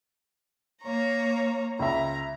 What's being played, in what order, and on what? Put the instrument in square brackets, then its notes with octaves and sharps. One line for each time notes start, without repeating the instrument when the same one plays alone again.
[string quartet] A#3 C#5 A#5
[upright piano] C#2 E5 [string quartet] A#5